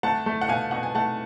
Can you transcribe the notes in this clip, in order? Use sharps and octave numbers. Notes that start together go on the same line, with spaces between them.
A3 F#5 A5
A3
F#5
B2 F5 G#5
B2 F#5
G#5
A3 F#5 A5